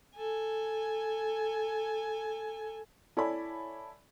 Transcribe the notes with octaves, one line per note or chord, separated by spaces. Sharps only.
A4 G#5
E4 A4 C#5 D5 G#5 B5